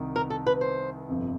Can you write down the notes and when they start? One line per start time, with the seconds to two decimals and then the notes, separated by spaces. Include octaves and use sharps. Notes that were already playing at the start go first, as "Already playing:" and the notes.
Already playing: C2 C3 D#3
0.16 A#4
0.30 A4
0.47 B4
0.61 C5
1.08 G1 F2 C3